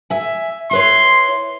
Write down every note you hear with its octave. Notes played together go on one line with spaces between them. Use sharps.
E5 G#5
E4 B4 C#5 C6